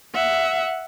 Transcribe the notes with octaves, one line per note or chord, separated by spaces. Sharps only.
E5 F#5